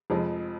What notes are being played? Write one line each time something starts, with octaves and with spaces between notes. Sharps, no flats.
F1 F2 F3 G#3